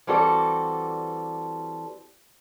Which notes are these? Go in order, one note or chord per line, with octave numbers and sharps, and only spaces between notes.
E3 G3 C4 F#4 A4 D5